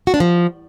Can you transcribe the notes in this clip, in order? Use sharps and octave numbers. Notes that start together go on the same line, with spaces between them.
F#4
D4
F3